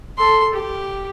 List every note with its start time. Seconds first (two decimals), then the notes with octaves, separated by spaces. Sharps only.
0.18 A4 C6
0.54 G4